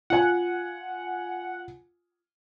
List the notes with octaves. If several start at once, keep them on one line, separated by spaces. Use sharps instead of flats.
F4 F#5 G#5